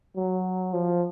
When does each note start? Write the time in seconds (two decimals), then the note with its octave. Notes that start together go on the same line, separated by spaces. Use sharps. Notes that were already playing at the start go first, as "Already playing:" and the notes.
0.16 F#3
0.73 F3